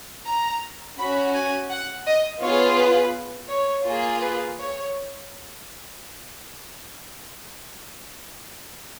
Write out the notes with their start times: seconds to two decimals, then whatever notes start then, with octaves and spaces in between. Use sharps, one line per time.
0.27 A#5
0.98 C#4 F#4 B5
1.35 G#5
1.71 F#5
2.07 D#5
2.42 B3 F4 G#4 C#5
2.78 B4
3.50 C#5
3.86 A#3 F4 G#4
4.22 B4
4.59 C#5